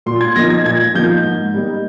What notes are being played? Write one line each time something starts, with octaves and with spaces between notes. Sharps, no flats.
A#2 C6
G#6
F3 A#3 D#4 A#6
G#6
A#2 G#6
F3 A#3 D#4 G6
G#2
G3 A#3 D#4